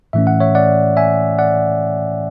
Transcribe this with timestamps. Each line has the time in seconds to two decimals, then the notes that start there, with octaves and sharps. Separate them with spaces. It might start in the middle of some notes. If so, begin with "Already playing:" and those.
0.13 A2 E3 A3 C#4 E5
0.27 F#5
0.40 C#5 E5
0.55 D5 F#5
0.97 E5 G#5
1.39 D5 F#5